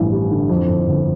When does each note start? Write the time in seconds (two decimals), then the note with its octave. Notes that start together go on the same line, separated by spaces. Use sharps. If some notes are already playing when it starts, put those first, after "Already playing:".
Already playing: A1 G2 F3
0.12 G3
0.31 D3
0.49 F2
0.68 G1
0.86 G1